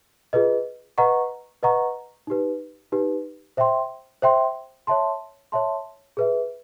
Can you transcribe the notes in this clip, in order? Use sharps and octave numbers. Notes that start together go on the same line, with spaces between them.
F4 G#4 B4 D#5
B4 D#5 F#5 A#5 C#6
B4 D#5 F#5 A#5 C#6
D#4 G4 B4
D#4 G4 B4
C5 E5 G5 C6
C5 E5 G5 C6
C#5 E5 A5 C6
C#5 E5 A5 C6
G#4 B4 E5